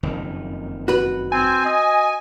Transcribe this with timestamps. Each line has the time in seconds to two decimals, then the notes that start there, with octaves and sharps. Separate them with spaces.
0.03 F#1 F2 D#3
0.88 F#4 B4
1.32 C4 G#5
1.65 D#5